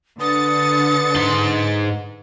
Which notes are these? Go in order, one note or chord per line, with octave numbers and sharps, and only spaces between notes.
D3 B4 D#6 A6 C#7
G#2 C6